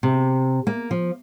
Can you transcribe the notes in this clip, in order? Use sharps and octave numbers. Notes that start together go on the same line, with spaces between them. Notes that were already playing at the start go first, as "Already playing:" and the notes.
C3
A#3
F3